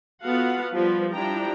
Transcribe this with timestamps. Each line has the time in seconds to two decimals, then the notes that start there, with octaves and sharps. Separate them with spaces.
0.23 B3 F4 F#4 A4 F5 F#5
0.73 F3 G3 F4 B4
1.12 F3 G3 D4 E4 G5 A#5